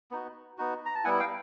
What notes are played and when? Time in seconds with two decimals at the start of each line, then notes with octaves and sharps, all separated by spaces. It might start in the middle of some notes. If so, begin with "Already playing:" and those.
0.11 B3 D#4 F#4
0.58 B3 D#4 F#4
0.86 A#5
0.95 A5
1.04 G3 B3 E4 F#5 G#5
1.20 F5 G5